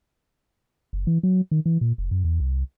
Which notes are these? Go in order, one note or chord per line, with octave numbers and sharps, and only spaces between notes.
F#1
E3
F#3
D#3
E3
A#2
F1
F#2
E2
C2